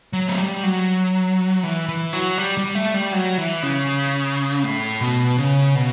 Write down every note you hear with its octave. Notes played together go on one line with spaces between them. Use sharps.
F#3
A3
G3
F#3
E3
E3
F#3
G3
G3
A3
G3
F#3
E3
C#3
A2
B2
C#3
B2